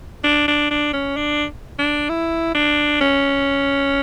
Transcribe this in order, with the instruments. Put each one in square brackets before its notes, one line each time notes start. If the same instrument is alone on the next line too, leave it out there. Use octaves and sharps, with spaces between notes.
[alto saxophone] D4
D4
D4
C#4
D4
D4
E4
D4
C#4